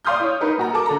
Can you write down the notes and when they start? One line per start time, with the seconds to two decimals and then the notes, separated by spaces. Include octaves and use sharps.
0.05 D5 F5 C6 D#6 F6 G6
0.20 E4 C#5
0.41 D#4 A#4 B4
0.58 A#1 F#4 A#5
0.73 A4 A#4 A5 D6
0.86 D3 A4 A#5